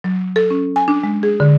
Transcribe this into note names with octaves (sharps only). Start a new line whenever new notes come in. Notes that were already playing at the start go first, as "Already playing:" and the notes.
F#3
A4
C#4
G#5
D4
G#3
G#4
D3